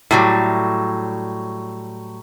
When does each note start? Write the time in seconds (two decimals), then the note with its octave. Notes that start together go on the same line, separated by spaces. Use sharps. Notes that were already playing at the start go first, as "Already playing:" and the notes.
0.11 A2 F#3 G3